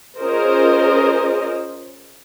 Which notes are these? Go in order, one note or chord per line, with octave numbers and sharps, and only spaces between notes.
C#4 F4 G#4 A#4 C5 D#5